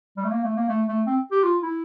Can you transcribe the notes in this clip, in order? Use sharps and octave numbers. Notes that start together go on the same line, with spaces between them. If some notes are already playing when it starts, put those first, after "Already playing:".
G3
A3
A#3
A3
A#3
A3
A3
C4
G4
F4
E4